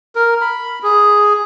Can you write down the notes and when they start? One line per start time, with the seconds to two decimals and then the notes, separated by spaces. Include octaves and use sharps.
0.16 A#4
0.42 B5
0.83 G#4